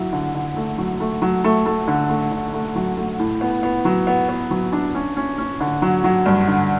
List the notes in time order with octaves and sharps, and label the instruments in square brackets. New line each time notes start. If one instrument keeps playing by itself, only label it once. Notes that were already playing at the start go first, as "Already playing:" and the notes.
Already playing: [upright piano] F#3 E4
D3
D3
A3
F#3
A3
F#3
A3
A3
D3
A3
D3
A3
F#3
A3
A2
B3
B3
F#3
B3
B3
F#3
D4
C#4
C#4
C#4
D3
F#3
F#3
G2
D3